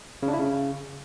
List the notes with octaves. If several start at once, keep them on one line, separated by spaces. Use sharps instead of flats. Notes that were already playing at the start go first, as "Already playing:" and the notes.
C#3
D4
E4
C#3